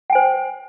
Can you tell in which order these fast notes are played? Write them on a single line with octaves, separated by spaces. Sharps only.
G5 G#5 C5